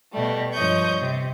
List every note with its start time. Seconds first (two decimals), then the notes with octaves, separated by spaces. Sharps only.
0.11 B2 G3 A3
0.52 G2 F3 C#5 D#5 C#6 G6
0.98 C3